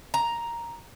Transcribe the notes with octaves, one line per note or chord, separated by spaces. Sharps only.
A#5